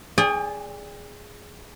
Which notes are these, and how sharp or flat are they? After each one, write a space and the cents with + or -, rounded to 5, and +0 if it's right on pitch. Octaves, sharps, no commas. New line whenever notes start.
G#4 +0 D5 -20 G5 +40